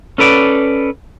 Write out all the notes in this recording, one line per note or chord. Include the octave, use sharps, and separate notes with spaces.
C#4 A4 B4 D5